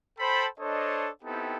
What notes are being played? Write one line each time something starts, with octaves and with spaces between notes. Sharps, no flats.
A4 C5 G5 A5 B5
D4 A4 C5 C#5 D#5
B3 C4 D#4 E4 G4 A4